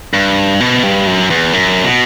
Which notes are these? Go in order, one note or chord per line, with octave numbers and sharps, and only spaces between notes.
G2
B2
G2
F#2
E2
F#2
B2